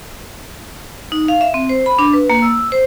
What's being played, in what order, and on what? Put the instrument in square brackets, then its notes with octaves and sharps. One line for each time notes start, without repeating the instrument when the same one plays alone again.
[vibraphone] D#4
F5
E5
C4
C5
B5
D4
B4
A#3
E6
C5